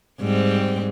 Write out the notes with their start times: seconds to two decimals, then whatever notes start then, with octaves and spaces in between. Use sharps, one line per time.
0.20 G#2 G3 C4